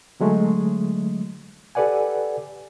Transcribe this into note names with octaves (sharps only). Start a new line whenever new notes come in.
D3 F#3 G#3 A3
G4 A4 B4 D5 F#5 G#5